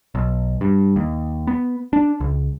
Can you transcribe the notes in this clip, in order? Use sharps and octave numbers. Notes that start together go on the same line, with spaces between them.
B1
G2
D#2
B3
D4
C#2